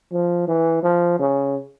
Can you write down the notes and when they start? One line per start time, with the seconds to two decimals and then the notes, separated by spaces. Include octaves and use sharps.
0.12 F3
0.47 E3
0.83 F3
1.19 C#3